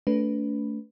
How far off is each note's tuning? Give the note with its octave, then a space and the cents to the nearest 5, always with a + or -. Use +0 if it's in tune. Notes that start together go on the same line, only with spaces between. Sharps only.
A3 +0 D4 -45 B4 +0